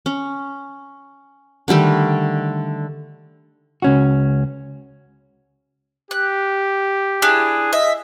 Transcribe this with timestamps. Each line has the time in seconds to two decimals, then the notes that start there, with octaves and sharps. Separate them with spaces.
0.06 C#4
1.68 D3 D#3 G3 A3
3.82 C#2 C#4 F#4
6.11 G4 F#6
7.22 D4 E4 G#4
7.73 D#5 E5